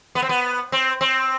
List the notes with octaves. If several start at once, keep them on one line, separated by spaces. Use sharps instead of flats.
B3
C4
B3
C4
C4